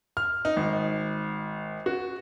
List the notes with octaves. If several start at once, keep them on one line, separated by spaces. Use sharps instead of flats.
F6
D#4
G#1
F#4